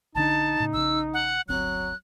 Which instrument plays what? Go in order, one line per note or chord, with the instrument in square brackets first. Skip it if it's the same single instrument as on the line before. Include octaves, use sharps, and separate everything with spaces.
[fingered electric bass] A#1 D3 D4 [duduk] D#4 [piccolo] A5
[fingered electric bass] A2 C#3
[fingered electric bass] A#1 C#3 [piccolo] E6
[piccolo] F#5
[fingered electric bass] D1 G1 C4 [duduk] F#3 [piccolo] F#6